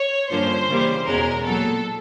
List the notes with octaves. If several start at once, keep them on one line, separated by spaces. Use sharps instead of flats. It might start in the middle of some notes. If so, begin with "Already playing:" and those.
Already playing: C#5
G2 D3 F3 A#3 C#4 C5
C#3 E3 G3 A#3
E2 B2 G#3 C#4 A#4
A#2 F#3 B3 A4